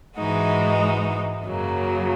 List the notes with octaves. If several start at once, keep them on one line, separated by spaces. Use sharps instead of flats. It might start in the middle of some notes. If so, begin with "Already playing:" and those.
G#2 E3 G#3 D#4 F#4
F#2 C#3 F#3 A#3